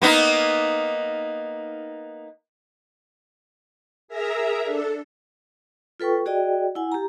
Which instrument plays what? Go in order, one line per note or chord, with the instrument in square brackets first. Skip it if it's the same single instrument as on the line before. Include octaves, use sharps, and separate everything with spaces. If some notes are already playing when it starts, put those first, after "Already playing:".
[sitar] A#3 B3 D#4
[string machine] G#4 A#4 E5 A#5
D4 A4
[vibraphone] F4 A4 B4 G5 C#6
F#4 G#4 D5 D#5 G5
E4 F#5 G#5
G4 A#5